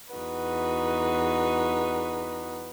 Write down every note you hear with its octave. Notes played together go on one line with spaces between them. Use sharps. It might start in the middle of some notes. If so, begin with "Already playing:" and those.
E2 D#4 F#4 B4